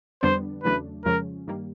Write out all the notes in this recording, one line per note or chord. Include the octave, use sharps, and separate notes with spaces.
F2 D3 G3 B3 D4 C5
E2 C#3 F#3 A3 D4 B4
F2 C#3 F3 G#3 C#4 A#4
G2 D#3 G3 A#3